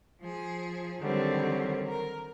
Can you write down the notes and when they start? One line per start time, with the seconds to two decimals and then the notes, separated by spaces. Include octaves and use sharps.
0.20 F3 G#4
1.00 D3 D#3 F#3 G3 C4 C#5
1.87 A#4